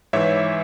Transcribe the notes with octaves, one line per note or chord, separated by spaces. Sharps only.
G#2 E3 C#5 E5